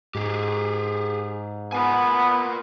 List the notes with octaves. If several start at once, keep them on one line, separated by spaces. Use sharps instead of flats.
G#2 G4 G#4
B3 F4 A#4 G#5